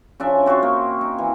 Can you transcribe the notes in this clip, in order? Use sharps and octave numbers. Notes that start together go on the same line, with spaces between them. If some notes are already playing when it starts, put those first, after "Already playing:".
C#3 F3 D4 E5
C4 F#4 C5 C#6
A#3
D#4
E3